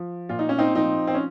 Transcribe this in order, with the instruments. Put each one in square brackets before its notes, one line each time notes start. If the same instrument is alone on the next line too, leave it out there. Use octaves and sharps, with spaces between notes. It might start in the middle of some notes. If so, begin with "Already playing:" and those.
Already playing: [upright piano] F3
A#2 F4
D#4
C#4
C4 D#4
F3 C4 D#4
C4
C#4